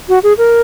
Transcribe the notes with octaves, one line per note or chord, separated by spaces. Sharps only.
F#4
G#4
A#4